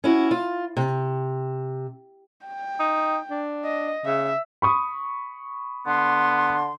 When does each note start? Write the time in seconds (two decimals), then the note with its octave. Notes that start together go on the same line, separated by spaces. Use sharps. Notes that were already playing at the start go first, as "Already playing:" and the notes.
0.04 C#4 E4 F#4
0.31 F4
0.77 C3
2.46 G5
2.79 D#4
3.31 D4
3.64 D#5
4.06 C#3 E5
4.62 B5 C#6 D#6
5.86 D3 B3 C6